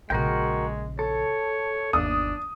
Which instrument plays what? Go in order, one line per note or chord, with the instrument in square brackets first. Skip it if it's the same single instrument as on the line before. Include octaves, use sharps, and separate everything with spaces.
[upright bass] A#1 C#3 [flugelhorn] G#3 [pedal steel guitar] F#4 A#4 G5
[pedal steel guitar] A4 [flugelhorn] C#5
[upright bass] G1 D#2 [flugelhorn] D4 [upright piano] D#6